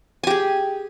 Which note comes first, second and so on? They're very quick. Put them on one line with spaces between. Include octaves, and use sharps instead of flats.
G#5 G4 G#4